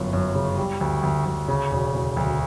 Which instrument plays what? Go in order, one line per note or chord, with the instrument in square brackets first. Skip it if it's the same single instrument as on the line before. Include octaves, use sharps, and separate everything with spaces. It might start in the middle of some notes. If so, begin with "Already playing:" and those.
Already playing: [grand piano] G1 F#2
F#2
C#3
G3
D2
D2
D2
C#3
E1
E1
D2